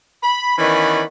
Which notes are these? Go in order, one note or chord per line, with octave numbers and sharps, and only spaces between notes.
B5
D#3 E3 B3 C#4 D5 B5